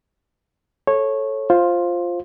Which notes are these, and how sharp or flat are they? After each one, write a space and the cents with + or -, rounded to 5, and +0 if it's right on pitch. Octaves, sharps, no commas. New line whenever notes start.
A4 -5 C#5 -15
F4 +0 C5 +10